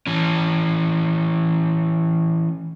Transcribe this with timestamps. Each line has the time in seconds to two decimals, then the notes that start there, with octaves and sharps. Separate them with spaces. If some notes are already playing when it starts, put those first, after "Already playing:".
0.07 E3 C#4